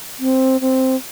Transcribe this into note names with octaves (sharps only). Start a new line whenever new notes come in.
C4
C4